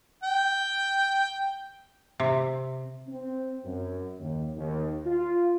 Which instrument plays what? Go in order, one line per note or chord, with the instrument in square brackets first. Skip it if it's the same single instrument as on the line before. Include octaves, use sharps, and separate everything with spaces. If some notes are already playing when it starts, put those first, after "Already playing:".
[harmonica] G5
[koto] C3
[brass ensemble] C4
F#2
D#2
D#2
F4